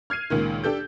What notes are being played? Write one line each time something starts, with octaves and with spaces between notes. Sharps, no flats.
F6 G#6 C7 D#7
C#2 A#2 D#3
D4 G4 A4 G6